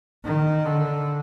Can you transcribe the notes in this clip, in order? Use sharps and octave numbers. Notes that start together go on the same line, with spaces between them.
D#3
D3